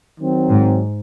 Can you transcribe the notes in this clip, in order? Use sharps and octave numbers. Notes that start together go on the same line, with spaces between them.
D#3 F#3 C4
G#2